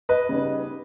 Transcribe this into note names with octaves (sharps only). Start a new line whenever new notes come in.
B4 D#5
C#3 G3 B3 D#4